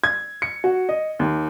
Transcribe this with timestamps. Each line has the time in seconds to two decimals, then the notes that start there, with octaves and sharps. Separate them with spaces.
0.04 G#6
0.42 C#7
0.64 F#4
0.89 D#5
1.19 D#2